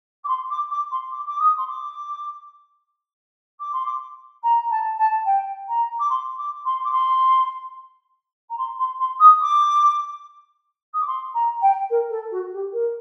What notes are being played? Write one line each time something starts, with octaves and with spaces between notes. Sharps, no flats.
D6
C6
D6
D6
C6
D6
D6
D#6
C6
D6
D6
C6
D6
A#5
A5
A5
G5
A#5
D6
C6
D6
C6
D6
C6
A#5
C6
C6
C6
D#6
D6
D#6
D6
C6
A#5
G5
A#4
A4
F#4
G4
A#4